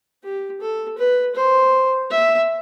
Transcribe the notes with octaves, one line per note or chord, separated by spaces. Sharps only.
G4
A4
B4
C5
E5